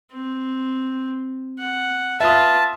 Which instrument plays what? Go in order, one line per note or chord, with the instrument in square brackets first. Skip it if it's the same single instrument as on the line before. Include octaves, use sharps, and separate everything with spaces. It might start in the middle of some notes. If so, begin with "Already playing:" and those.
[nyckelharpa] C4
F#5
[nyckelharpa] F4 B4 [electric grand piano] E5 D#6 [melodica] A5